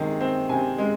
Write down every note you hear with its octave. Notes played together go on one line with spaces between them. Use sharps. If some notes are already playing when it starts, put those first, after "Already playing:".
Already playing: C3 D#3 G#3
C4
C3 G#5
G#3